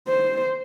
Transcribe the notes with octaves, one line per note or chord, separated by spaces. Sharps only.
C5